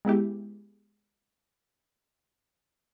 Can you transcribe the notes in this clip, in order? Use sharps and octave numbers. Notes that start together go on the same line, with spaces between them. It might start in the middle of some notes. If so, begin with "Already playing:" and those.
G#3 B3 E4 G4